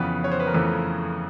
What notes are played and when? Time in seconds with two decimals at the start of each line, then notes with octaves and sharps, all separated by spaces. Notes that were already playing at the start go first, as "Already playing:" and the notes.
Already playing: F2 C#3 E3 B3 B4
0.24 C#5
0.31 C5
0.40 B4
0.47 A#4
0.54 F2 C#3 E3 A3 A4